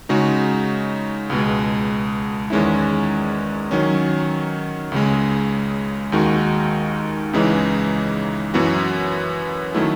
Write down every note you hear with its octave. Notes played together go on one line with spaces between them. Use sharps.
C#3 G#3 D#4 F#4
C#2 B2 G#3
E2 D#3 G#3 C#4 E4
D#3 F#3 C#4
C#2 C#3 G#3
D#2 D#3 G#3 D#4 F#4
C#2 C#3 E3 G#3 D#4
F#2 E3 B3 F#4
D#3 F#3 A3 E4